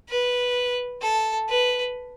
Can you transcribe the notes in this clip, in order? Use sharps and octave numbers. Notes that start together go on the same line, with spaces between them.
B4
A4
B4